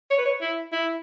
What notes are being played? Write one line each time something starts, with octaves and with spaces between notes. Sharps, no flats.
C#5
B4
C#5
E4
E4